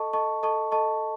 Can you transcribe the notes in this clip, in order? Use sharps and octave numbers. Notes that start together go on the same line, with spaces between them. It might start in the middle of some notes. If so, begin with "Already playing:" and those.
Already playing: A4 D#5 A5 C#6
A4 D#5 A5 C#6
A4 D#5 A5 C#6
A4 D#5 A5 C#6